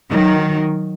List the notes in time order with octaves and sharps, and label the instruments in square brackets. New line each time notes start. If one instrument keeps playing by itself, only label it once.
[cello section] D#3 F#3